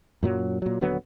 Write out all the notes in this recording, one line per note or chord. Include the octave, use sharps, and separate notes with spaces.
F#2 A#2 F#3
A#2 F#3
D#1 D3 F#3 B3